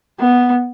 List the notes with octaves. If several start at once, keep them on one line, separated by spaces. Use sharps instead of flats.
B3